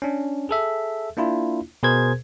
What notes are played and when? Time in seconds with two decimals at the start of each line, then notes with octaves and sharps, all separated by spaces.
0.02 C#4 D4
0.49 G#4 A4 E5
1.17 A#3 D4 E4 F4
1.83 B2 G#4 A#4 C5 G#6